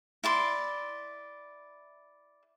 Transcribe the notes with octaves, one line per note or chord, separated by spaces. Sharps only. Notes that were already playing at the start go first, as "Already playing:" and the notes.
E4 D5 C6